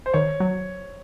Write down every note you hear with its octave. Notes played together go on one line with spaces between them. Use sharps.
C5
D#3 C#5
F#3